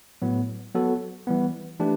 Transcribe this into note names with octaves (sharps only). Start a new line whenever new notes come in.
A2 F#3 B3
F#3 B3 F#4 A4
E3 G3 B3
E3 A3 D4 G4 B4